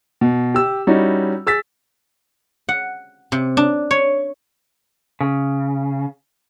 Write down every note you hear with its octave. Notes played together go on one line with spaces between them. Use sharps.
B2
G4 E6
G3 C#4 D#4 E4 F#4
G#4 E6 A6 B6
F#5
C3
D4
C#5
C#3